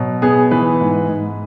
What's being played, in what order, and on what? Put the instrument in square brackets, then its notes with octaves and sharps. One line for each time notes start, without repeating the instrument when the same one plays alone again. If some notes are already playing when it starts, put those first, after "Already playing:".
Already playing: [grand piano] B2 F#3
B3 G#4
E3 B4
G#2
G#2